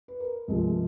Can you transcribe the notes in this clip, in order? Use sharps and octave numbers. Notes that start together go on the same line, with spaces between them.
B4
A#4
C#2 C3 F3 G#3